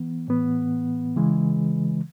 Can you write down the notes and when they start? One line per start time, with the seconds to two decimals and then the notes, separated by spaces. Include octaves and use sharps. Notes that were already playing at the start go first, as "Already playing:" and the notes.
Already playing: E3 B3
0.28 A2 E3 B3
1.16 C#3 E3 G#3